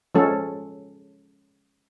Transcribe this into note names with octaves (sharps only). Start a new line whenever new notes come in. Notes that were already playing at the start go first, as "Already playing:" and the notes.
F3 G#3 C#4 A4